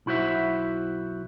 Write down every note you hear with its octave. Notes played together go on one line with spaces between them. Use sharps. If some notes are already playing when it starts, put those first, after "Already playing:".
B1 E4 F#4 C5 E5